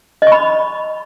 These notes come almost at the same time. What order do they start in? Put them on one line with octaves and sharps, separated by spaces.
D#5 C#6 B5